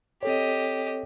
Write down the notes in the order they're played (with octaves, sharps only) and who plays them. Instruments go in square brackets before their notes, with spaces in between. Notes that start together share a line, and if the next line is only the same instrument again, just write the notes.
[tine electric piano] C4 A4 C#5 [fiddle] G4 D#5